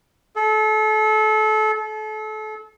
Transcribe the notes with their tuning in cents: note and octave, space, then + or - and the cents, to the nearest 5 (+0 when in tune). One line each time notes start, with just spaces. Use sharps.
A4 -30
A4 -35